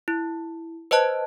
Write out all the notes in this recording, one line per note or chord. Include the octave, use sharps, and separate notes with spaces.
E4
B4 C5 D#5 A5 F#6